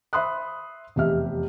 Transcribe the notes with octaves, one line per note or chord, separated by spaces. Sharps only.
C5 E5 B5 C6 D#6 F#6
F1 E2 G4 D#5 E5 F6